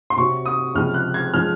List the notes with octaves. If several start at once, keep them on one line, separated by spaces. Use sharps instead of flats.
C6
C3 F#3 C4 C#6
D#6
C#2 C3 F3 G#3 C4 F6
F#6
G#6
F3 G#3 C#4 F6